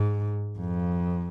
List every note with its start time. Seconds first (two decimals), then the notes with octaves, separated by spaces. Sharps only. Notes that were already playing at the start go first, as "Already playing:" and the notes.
Already playing: G#2
0.59 F2